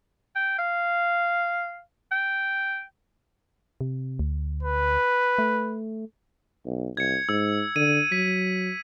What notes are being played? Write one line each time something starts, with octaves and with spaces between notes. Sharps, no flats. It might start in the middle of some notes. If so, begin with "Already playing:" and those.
G5
F5
G5
C3
D2
B4
A3
B1
C2 G#6 C#7
G#2 E6
D3 D#7
F#3 B6